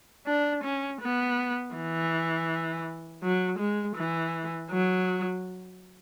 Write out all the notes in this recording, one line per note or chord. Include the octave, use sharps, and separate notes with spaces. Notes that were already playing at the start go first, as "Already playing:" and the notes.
D4
C#4
B3
E3
F#3
G#3
E3
F#3